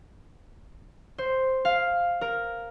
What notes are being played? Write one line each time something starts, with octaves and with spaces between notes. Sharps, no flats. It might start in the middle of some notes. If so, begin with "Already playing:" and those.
C5
F5
A#4